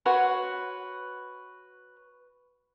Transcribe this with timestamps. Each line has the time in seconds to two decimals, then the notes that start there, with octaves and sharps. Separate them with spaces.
0.05 F#4 B4 C#5 C6